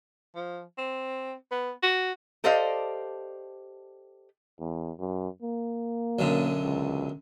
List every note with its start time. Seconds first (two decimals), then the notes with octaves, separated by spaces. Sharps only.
0.35 F3
0.78 C4
1.51 B3
1.83 F#4
2.44 G4 A4 C5 D5 D#5 F5
4.60 E2
4.99 F#2
5.42 A#3
6.19 B1 F#2 D3
6.63 C#2